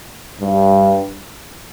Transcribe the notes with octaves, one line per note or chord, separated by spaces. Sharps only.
G2